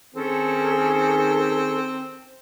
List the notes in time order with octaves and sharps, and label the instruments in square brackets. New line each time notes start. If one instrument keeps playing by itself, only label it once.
[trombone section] D#3 G#4 [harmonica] C4 [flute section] C#4 A4